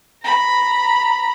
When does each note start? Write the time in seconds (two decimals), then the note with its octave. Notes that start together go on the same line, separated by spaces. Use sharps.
0.24 A#5 B5